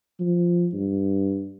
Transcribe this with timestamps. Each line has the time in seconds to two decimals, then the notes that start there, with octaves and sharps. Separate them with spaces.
0.20 F3
0.74 G2